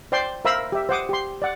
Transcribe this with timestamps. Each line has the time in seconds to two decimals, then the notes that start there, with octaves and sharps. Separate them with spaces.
0.12 C5 D5 G5 C6
0.45 A#4 C5 E5 F5 B5 E6
0.72 G4 E5
0.89 C5 F#5 D6 D#6
1.09 G4 C6
1.42 D5 F#5